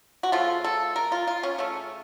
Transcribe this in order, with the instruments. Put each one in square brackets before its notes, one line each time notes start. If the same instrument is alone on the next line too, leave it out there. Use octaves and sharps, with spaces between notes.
[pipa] F#4
C#3 F3 A3 F4
A4
A#4
F4
F4
C#4
C#3 A3 C#4